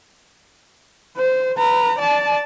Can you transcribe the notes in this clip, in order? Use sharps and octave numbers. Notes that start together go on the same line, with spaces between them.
C5
B4 A#5
D5 A5